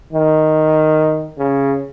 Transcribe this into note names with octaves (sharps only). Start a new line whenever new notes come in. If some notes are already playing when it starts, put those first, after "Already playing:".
D#3
C#3